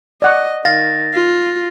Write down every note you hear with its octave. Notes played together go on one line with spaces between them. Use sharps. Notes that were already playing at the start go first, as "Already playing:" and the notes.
D5 D#5 F#5 C#6
D#3 F5 A6 A#6
F4